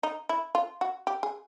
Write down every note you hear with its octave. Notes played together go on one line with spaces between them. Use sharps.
D#4
E4
F4
F#4
G4
G#4